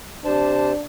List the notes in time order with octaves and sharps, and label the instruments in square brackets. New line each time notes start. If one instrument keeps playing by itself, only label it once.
[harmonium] C3 C5 A5 [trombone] D4